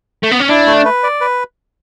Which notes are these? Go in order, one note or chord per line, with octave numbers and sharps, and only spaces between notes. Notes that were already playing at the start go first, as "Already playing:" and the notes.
A3
B3
C#4
D4 E4
A3
B4
D5
B4